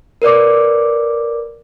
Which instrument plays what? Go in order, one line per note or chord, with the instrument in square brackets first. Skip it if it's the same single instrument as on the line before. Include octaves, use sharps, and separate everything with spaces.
[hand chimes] A#4 B4 D5 D6